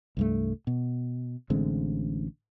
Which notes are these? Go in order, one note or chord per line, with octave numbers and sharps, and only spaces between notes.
C2 G2 A3
B2
A1 D3 G#3 C4